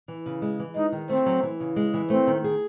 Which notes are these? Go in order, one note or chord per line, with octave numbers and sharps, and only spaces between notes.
E3
C#3
G#3
E3
G#3 D#4
D#3
A3 C4
F#3
E3
C#3
G#3
E3
A3 C4
D#3
G#4